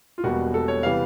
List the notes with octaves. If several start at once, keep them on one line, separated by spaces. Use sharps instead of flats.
F4
E1 E2 B2 G3 A#3 F#4
A4
C#5
C3 E3 G3 B3 F5